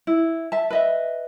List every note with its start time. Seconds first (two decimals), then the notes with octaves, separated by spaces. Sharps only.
0.07 E4
0.52 E5 A5
0.70 B4 D#5 E5